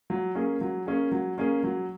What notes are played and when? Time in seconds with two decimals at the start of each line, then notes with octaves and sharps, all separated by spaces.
0.10 F#3
0.35 A#3 C#4 G#4
0.61 F#3
0.86 A#3 C#4 G#4
1.12 F#3
1.38 A#3 C#4 G#4
1.64 F#3